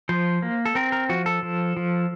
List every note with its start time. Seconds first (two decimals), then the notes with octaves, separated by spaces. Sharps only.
0.09 F3 C5
0.42 A#3
0.65 A4
0.75 C4 A#4
0.92 A#4
1.09 F3 F#4
1.26 A4
1.43 F3
1.77 F3